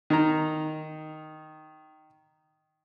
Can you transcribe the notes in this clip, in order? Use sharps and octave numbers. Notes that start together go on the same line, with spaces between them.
D#3 A#5